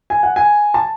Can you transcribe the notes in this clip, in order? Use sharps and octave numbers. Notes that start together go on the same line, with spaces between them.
G#5
F#5
G#5
A5